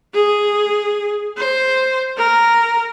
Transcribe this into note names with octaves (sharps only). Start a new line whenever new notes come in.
G#4
C5
A#4